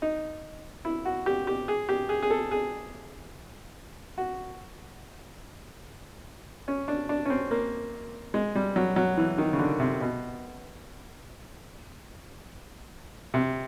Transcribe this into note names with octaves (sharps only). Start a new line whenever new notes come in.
D#4
E4
F#4
G4
G4
G#4
G4
G#4
G#4
A4
G#4
F#4
C#4
D4
D4
C#4
C4
A#3
G#3
G3
F#3
F#3
E3
D#3
C#3
D3
C3
B2
C3